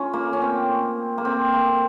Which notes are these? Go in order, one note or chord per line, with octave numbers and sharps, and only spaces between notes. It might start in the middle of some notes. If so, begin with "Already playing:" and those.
Already playing: C#4 F4
A#3
C#4
C4
A#3
C4
A#3